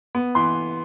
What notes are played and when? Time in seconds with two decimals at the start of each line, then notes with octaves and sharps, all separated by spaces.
0.15 B3
0.35 E3 C6